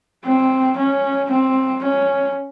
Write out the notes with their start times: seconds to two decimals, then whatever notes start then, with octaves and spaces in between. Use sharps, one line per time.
0.24 C4
0.77 C#4
1.31 C4
1.83 C#4